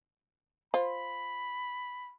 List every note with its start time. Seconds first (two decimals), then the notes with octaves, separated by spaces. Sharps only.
0.74 F4 C5 B5